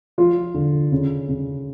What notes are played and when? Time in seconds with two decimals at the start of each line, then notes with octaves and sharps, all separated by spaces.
0.18 F3 F4
0.54 D3
0.92 C#3
1.29 C#3